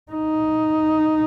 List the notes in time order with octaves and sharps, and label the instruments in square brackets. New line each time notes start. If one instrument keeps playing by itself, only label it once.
[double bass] D#4